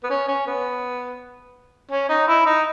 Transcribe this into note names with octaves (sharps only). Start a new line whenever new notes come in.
B3
C#4
C#4
B3
C#4
D#4
E4
D#4